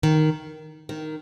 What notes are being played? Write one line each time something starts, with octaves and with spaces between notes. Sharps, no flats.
D#3
D#3